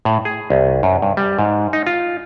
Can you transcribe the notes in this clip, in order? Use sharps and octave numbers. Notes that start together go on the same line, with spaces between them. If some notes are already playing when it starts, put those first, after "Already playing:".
A2
G#4
C2
F#2
G2
G3
G#2
D#4
F4